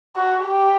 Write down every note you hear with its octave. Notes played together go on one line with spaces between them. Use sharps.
F#4
G4